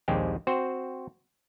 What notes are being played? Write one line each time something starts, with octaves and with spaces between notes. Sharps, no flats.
A#1 D#2 G#3 C4 G4
C4 F#4 C5